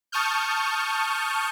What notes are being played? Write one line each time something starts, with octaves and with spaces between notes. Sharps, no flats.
A5 C#6 D#6 F6 G6